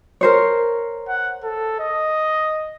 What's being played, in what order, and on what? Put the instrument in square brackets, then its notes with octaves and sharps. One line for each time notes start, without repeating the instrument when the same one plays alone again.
[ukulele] A#4 C5 C#5
[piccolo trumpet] F#5
A4
D#5